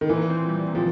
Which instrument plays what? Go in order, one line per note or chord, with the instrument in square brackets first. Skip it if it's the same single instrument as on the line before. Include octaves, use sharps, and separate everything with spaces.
[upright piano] D#3
[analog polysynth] A#2 [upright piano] E3
[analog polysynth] C4
G3
A#2
[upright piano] F3